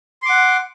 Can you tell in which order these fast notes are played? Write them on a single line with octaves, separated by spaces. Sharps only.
C6 D6 F#5